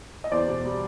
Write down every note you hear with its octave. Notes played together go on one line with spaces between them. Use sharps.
D#5
E2 C5 D5
B2
G3